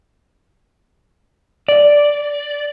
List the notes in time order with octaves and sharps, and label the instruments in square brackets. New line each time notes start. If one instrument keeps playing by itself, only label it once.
[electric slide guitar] D5